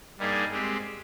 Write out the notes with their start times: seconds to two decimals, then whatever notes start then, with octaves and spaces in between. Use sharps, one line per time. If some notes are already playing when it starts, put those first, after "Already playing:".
0.18 G2 G3 A#3 D#4 G#4
0.51 G#3 C4 G4